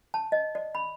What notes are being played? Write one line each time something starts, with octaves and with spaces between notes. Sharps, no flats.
A5
D#5
D5
B5